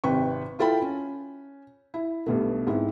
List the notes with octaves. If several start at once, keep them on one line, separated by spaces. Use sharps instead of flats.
G#1 C3 B4 G5 C#6
E4 F4 A4 G5 B5
C#4
E4
B1 G2 B2 A3
G#2 C4 E4